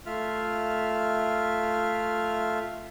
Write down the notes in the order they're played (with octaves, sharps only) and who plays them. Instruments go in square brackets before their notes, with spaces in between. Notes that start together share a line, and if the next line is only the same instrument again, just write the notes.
[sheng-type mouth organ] A3 F4 E5 F6